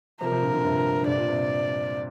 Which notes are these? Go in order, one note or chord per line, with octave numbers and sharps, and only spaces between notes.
C3 F3 A#4
C3 F3
A#2 D3
A#2 D3
G2 C3
D3
G2 C3 D5
A#2
C3